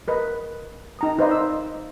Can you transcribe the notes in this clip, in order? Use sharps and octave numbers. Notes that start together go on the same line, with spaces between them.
A#4 B4 D#5
D#4 A#5 D#6
D#4 B4 C5 D5 D#5 F5
E6